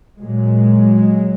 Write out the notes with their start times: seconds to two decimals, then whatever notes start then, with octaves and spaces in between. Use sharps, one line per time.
0.20 A#2 F#3 G#3